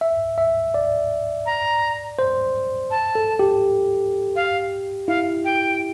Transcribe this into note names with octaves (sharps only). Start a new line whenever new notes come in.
E5
E5
D5
A#5
C5
A5
A4
G4
F5
E4 F5
G5